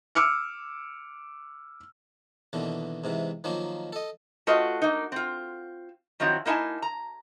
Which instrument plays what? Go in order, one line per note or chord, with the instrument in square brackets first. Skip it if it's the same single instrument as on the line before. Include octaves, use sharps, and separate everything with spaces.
[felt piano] D6 E6 F6 C#7
[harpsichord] D#2 B2 D3 E3
G#2 C3 E3
D#3 F3 F#3 A#3
A4 D#5
[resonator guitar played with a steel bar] A3 F4 F#4 B4 D#5
A#3 D#4
C4 F4
D#3 F3 F#3 C4 E4
A#3 D#4 E4 F#5 G#5 A5
A#5